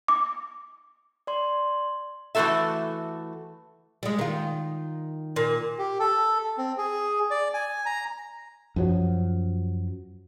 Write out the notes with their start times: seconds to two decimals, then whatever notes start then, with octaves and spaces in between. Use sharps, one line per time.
0.08 D6
1.27 D5 C6
2.35 E3 A3 C4 F#4 A4 E5
4.03 G3 G#3
4.19 D#3 F4
5.36 A#2
5.78 G4
6.00 A4
6.58 C4
6.78 G#4
7.31 D5
7.54 G#5
7.86 A#5
8.76 F#2 F3 F#3